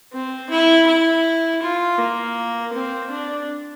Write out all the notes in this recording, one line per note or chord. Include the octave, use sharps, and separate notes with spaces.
C4
E4
E4
F4
A#3
C4
D4